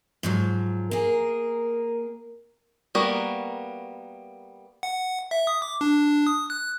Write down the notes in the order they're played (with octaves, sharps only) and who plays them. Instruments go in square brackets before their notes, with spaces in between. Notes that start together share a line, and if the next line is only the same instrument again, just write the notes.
[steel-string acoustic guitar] G#2 F3 F#3
[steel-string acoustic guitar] A#3 G#4 [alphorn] A#4
[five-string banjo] G3 A#3 B3 F#4 A#4
[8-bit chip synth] F#5
E5
D#6
D6
D4
D#6
F#6